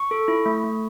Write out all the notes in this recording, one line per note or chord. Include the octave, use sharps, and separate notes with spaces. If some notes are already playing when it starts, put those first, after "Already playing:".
Already playing: C#6
A4
E4
A3
A3